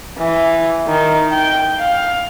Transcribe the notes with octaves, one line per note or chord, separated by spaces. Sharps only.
E3
D#3
G5
F5